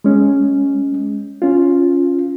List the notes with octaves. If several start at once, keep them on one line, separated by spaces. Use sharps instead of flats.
G#3 C#4
C#4 F4